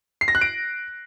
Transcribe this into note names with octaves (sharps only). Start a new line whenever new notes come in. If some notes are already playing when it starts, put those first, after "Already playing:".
C7
A#6
F#6
D7